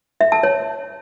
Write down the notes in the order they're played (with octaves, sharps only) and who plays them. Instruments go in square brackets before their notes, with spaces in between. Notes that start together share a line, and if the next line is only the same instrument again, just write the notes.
[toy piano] E5
A5
C#5